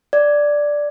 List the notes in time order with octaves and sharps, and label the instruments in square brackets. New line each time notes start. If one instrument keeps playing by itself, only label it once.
[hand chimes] D5